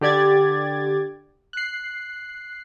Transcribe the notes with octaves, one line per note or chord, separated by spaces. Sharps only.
D3 G4 D5 G#6 A6
F#6 C7